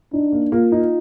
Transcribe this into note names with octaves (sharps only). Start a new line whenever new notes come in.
D4 D#4
A#3
A#3 F4
D#4